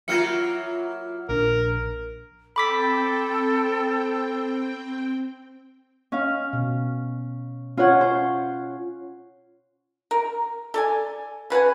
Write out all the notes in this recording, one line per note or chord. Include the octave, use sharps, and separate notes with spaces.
F#3 A#3 E4 F4 F6 C#7
A#1 D4 A#4
C4 A4 G5 B5 D6 B6
C#4 F5
B2
C#4 F4 C#5 F#5
C5
A#4
A4 D5 G#5
C#3 B4 F#5 G#5